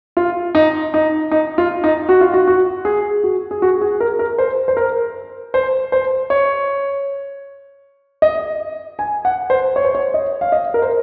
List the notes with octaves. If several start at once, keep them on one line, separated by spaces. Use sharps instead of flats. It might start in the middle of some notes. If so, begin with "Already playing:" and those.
F4
D#4
D#4
D#4
F4
D#4
F#4
F4
F#4
F#4
G#4
F#4
G#4
F#4
G#4
A#4
A#4
C5
C5
A#4
C5
C5
C#5
D#5
G#5
F#5
C5
C#5
C5
C#5
D#5
F5
D#5
A#4
C5